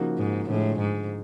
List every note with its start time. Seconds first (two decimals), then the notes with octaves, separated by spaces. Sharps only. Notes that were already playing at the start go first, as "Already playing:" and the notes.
Already playing: C#3 F3 A#3 D#4 F#4
0.18 G#2
0.49 A2 D3 F3 G#3
0.79 G#2